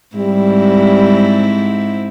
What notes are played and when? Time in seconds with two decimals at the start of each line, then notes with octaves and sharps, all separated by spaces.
0.16 G#2 G3 C4 E4